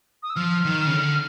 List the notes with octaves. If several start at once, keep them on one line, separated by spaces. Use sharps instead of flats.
D#6
E6
F3 F6
D#3
C#3
D3